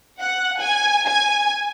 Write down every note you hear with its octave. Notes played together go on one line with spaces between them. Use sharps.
F#5
G#5
G#5